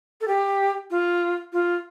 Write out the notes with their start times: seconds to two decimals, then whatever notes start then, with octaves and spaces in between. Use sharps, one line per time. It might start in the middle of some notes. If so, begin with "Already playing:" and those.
0.21 A4
0.28 G4
0.91 F4
1.53 F4